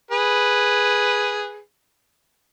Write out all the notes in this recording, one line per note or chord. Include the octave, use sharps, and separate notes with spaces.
G#4 B4